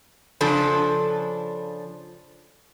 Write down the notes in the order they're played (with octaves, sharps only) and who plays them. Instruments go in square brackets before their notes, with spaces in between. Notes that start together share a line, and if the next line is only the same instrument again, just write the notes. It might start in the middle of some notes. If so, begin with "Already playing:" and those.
[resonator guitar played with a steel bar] C#3 F3 D4 A4